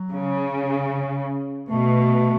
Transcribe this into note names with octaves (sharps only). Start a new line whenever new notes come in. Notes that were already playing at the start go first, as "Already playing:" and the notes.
Already playing: F#3
C#3
B2 A3